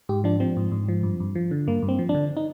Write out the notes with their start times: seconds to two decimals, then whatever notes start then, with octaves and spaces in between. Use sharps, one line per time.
0.09 G#2 G4
0.24 F3 D4
0.40 F3 C4
0.57 G#2
0.72 G#2
0.88 F3
1.03 G2
1.20 G2
1.35 F3
1.51 D3
1.67 G2 A#3
1.83 G2
1.89 C4
1.99 F3
2.09 D4
2.15 D3
2.37 D#4